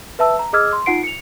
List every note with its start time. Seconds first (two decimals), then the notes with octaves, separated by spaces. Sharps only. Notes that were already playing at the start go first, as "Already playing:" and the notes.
0.19 B4 E5 A5 E6
0.39 A#5
0.53 G#4 D#5 D6 E6 F6 G#6
0.73 C6
0.86 D#4 F4 F#5 C7 D7
1.04 C#7 F7